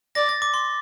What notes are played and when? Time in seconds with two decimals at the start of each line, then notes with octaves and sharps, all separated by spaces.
0.15 D5 A#6
0.29 A6
0.42 D6
0.54 C6